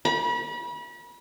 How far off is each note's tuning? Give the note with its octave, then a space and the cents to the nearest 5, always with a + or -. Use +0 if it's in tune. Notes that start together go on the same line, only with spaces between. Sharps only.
B5 -35